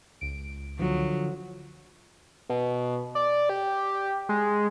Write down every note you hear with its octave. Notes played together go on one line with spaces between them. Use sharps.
C#2 D7
D3 F3 F#3
B2
D5
G4
G#3